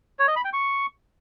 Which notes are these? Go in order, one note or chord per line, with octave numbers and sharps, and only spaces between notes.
C#5
D#5
B5
G5
C#6